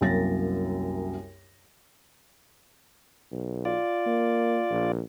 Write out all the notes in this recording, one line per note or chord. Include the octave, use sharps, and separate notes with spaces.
C2 F#2 F#3 A#3 A6 A#6
B1
F4 D5
A#3
A#1